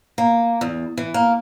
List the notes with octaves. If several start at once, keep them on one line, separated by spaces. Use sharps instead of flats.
A#3
E2
E3
A#3